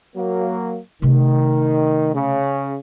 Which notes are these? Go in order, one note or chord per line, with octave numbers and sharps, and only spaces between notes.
F#3 A#3
C3 D#3 A3
C#3